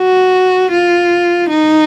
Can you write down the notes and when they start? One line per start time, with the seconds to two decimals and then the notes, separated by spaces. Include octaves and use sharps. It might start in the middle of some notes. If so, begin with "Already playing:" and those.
Already playing: F#4
0.71 F4
1.49 D#4